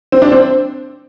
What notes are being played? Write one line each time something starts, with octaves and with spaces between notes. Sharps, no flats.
C4
D4
C4